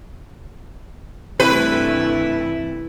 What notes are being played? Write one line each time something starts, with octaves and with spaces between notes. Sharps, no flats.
G2 C3 E3 A3 E4 B4